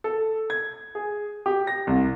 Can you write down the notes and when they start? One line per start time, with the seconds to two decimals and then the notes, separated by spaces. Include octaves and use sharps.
0.04 A4
0.50 G#6
0.95 G#4
1.46 G4
1.67 A#6
1.87 C2